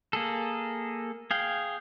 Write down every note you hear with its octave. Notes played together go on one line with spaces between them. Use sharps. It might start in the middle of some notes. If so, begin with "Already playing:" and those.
A#3 G#4 A4
G#4 F5 G5